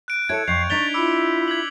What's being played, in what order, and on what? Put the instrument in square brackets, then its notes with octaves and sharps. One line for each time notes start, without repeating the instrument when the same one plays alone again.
[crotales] F#6 D7
[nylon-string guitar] E4 C#5 [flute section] A4 A5 [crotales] G#6 C#7
[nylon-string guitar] F2 [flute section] C#6 [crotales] G6 A6 F7 [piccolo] C7
[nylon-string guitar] D4 D#4 [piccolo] A6 [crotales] B6 F7 G7
[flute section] E4 F4 E5 [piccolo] B5 [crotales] D6 E6 C#7
[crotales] G#6 B6 F#7